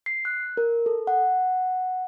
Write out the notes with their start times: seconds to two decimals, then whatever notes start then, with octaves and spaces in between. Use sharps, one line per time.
0.06 C7
0.25 F#6
0.57 A#4
0.86 A4
1.07 F#5